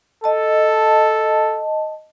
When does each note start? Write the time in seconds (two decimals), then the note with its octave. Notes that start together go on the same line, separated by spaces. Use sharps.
0.24 A4 D#5 A5